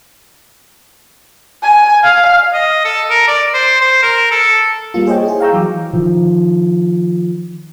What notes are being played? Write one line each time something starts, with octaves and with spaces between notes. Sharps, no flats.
G#5
F5
D#5
A4
A#4
D5
C5
C5
A#4
A4
G3 A#3 F4
G#4 C5 C#5 D#5 G5
E4 G#4
F5 G5 A#5 C#6 E6 G6
E3 F#3 D6
D#3 F3